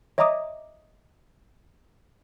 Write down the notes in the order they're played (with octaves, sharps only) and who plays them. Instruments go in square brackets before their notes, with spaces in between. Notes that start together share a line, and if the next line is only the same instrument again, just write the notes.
[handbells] C#5 D#5 E5 A#5 D6 D#6